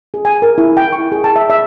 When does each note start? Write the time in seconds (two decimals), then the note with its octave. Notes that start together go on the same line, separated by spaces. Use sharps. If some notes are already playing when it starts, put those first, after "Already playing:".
0.14 G#4
0.25 G#5
0.42 A#4
0.58 E4
0.77 G5
0.92 C#6
1.12 G#4
1.24 A5
1.36 E5
1.50 E5